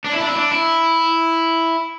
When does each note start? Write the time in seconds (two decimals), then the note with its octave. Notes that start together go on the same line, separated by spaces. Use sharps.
0.06 D4
0.14 E4
0.21 D4
0.28 E4
0.36 D4
0.52 E4